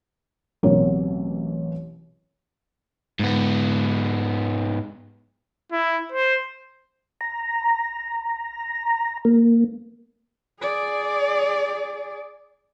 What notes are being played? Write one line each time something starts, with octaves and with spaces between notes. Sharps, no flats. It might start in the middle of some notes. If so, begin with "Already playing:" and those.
A1 B2 F#3 C4 A#4 C#5
G#2 B3
E4
C5
A#5
A#3
G#4 D5